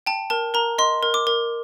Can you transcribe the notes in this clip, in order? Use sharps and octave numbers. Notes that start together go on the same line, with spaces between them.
G5 A5
A#4 A5
A#4 A#5
D#5 C6
A#4
D6
A#4